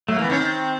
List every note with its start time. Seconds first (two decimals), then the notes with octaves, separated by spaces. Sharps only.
0.08 F#3 A3
0.17 E3 A#3
0.24 B3
0.29 D#3 C#4
0.40 C4